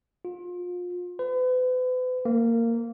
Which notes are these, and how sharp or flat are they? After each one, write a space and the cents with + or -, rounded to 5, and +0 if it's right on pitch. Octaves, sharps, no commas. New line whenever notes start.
F4 +30
B4 +40
A#3 -15